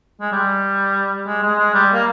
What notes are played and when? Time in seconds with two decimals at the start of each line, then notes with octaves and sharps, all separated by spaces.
0.21 G#3
0.32 G3
1.27 G#3
1.43 G#3
1.59 G#3
1.74 G3
1.94 A#3